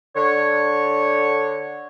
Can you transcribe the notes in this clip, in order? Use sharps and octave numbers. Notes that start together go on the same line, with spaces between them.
D3 C#5